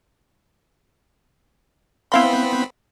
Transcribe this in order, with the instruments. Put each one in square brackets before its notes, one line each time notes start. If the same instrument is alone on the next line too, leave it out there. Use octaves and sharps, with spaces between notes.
[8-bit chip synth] B3 C4 B5 [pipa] E4 F5 C6